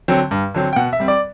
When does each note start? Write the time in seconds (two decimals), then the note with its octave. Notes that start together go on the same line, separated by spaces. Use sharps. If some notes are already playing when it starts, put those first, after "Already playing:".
0.08 D3 F#3 C4
0.31 G2
0.54 D3 F#3 C4
0.73 G5
0.76 B2 F#5
0.93 E5
1.00 G3 C4
1.08 D5